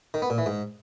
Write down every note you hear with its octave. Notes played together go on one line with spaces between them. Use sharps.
D#3
B3
A#2
E3
G#2